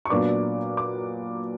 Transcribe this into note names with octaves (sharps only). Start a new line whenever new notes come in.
C#6
A#2 F#3 B3 D4 D6
D6